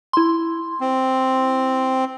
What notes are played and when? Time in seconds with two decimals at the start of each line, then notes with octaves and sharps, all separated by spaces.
0.13 E4 C6
0.81 C4